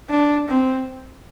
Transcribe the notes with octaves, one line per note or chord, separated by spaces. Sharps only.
D4
C4